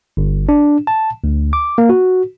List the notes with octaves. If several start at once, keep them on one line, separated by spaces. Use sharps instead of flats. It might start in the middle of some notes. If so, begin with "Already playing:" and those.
G1
D4
A5
D2
D6
A#3
F#4